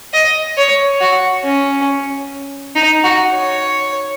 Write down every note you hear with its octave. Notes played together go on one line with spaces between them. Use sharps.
D#5
C#5
F#4
C#4
D#4
F#4
C#5